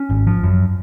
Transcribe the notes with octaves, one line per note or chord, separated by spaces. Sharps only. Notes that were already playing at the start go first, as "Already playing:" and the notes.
Already playing: C#4
G#1
F3
F#2